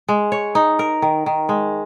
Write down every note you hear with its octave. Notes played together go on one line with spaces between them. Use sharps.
G#3
C#5
D#4
A#4
D#3
D#3
G#3